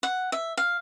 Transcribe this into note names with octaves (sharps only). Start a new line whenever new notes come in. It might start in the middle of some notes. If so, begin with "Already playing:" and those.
F#5
E5
F5